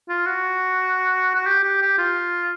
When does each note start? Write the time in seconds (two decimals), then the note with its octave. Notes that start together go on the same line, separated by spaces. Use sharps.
0.09 F4
0.27 F#4
1.35 F#4
1.46 G4
1.63 G4
1.82 G4
1.98 F4